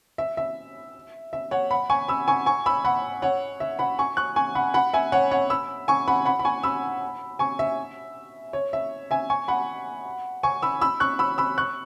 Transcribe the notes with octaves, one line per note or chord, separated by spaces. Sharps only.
E5
E5
E5
C#5 F#5
F#5 B5
G#5 C#6
B5 E6
G#5 C#6
G#5 C#6
B5 E6
F#5 B5
C#5 F#5
E5
F#5 B5
G#5 C#6
C#6 F#6
G#5 C#6
F#5 B5
F#5 B5
E5 G#5
C#5 F#5
C#5 F#5
B5 E6
G#5 C#6
F#5 B5
F#5 B5
B5
G#5 C#6
B5 E6
G#5 C#6
E5
C#5
E5
E5 G#5
G#5 C#6
F#5 B5
G#5 C#6
B5 E6
B5 E6
C#6 F#6
B5 E6
B5 E6
C#6 F#6